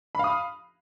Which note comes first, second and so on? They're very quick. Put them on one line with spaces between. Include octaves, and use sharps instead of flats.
B5 F5 D#6